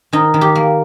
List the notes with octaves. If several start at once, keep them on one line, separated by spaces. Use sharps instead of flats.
D#3 D#4
D#3
G4
A#3